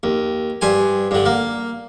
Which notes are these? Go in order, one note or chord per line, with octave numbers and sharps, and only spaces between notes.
D#2
G2 C5 G#5
G2 D3
A#3